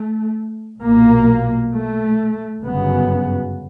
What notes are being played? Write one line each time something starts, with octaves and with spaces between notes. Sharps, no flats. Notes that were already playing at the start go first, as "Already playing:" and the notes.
Already playing: A3
B1 A#2 A#3
A3
G1 F#2 C#3 B3